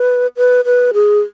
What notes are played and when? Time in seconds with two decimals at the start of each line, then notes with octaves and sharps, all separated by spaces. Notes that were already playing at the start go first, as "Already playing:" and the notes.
Already playing: B4
0.37 B4
0.65 B4
0.94 G#4